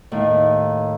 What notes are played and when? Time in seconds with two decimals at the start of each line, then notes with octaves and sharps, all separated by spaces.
0.11 D#2 A2 D#3